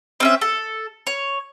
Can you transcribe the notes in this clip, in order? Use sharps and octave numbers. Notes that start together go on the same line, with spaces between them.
C4 C#4 E5
A4
C#5